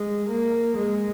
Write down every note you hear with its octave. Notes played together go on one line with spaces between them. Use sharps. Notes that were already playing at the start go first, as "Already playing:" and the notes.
Already playing: G#3
A#3
G#3